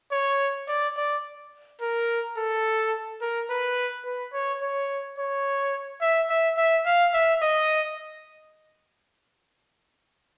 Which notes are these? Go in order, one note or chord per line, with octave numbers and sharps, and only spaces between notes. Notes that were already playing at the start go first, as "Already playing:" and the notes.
C#5
D5
D5
A#4
A4
A#4
B4
B4
C#5
C#5
C#5
E5
E5
E5
F5
E5
D#5